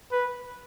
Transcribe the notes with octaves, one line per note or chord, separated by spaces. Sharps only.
B4